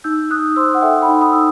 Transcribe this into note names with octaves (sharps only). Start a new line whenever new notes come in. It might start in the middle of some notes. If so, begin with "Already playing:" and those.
D#4 E6 G6
D#4 D#6 F#6
C5 C6 E6
F#5
A4 E5 G5
G5 B5
D#4
B5 D#6
D#4 E6